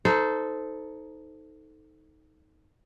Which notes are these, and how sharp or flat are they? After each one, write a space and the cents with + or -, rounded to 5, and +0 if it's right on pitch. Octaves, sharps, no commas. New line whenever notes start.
D#4 +15 A4 +0 C5 -15